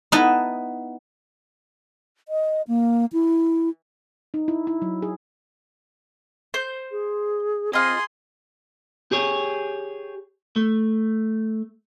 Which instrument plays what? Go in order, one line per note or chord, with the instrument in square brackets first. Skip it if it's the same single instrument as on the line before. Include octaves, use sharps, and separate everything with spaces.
[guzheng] B3 D#4 E4 B4 E5 A5
[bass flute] D#5
A#3
E4
[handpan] D#4
E4
E4
F#3
G#4
[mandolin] C5 G6
[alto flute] G#4
[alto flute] C4 [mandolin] F4 D#5 [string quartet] G#4 C6
[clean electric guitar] G4 G#4 C#5
A3